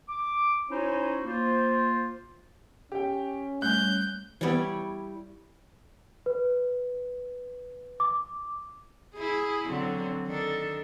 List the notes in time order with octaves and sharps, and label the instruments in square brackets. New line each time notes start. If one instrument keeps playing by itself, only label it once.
[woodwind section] D6
C#4 D#4 E4 F#4 C5 C#5
A#3 F4 C5
[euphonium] C#4 [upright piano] G4 G5
[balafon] G3 A3 [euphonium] C#4 [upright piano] F#6 [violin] G6
[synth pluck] E3 B3 [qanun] G3 E4 C#5
[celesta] B4
D6
[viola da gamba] E4 G#4
D3 F#3 C4
D#3 D4 A4